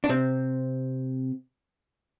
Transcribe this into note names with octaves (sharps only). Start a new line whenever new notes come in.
D4
C3 C4